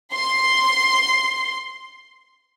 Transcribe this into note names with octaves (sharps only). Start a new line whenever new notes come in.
C6